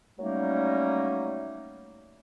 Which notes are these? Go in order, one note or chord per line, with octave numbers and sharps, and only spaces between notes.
F#3 G3 A3 A#3 C#4 D#4